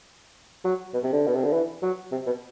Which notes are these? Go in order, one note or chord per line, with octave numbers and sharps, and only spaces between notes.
F#3
B2
C3
D3
B2
C3
D3
E3
F#3
C3
B2